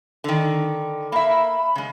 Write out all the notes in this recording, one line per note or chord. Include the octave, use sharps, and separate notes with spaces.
D3 D#3
A#3 E5 B5
C#3 G#3